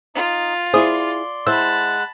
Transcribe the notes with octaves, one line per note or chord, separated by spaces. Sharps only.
D#4 F4
E4 G#4 C5 D5 C6 D#6
G#3 E4 C5 F#5 A5 B5 E6